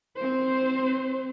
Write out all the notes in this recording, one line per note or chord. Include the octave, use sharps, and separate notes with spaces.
C4 C5